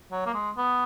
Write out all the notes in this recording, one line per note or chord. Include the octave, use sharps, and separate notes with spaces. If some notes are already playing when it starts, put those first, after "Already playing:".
F#3
A#3
G#3
B3